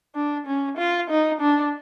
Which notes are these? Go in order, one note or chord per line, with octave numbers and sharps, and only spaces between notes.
D4
C#4
F4
D#4
D4